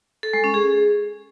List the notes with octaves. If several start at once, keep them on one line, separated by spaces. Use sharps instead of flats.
A4
G#3
C#4
G#4